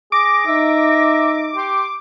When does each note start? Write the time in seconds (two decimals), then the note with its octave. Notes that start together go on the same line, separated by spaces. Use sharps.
0.12 G#4 D6 A#6
0.47 D#4 E5
1.56 G4 C6